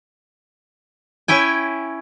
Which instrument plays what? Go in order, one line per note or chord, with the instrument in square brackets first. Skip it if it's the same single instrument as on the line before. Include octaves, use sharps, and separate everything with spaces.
[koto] C#4 E4 G5 G#5